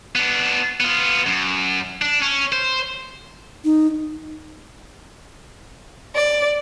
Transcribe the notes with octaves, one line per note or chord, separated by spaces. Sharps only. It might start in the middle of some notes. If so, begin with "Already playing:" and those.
B3 D4
B3 F4
F#2
D4
C#4
C5
D#4
D5